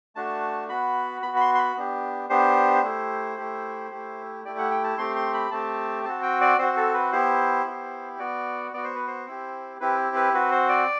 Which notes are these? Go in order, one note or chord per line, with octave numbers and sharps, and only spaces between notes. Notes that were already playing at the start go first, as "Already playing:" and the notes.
A3 D4 F#4 A5
B3 F#4 B5
B3 B5
F#4
B5
C6
C6
B5
B3 D4 G4
B3 D4 G4 C5
A3 E4 G4
A3 E4 G4
A3 E4 G4
A3 E4 G4 D5
F#5
G5
A5
A3 C4 G4 C6
C6
B5
A3 C4 G4 A5
C4 F#4 A5
G5
D5
C4 F#4 C5
A4
B4
B3 E4 G4 C5
B3 E4 G4
B3 F#4 D5
B3 F#4 D5
C5
B4
C5
C4 E4 G4
C4 E4 G4 B4
B4
C4 F#4 B4
C5
D5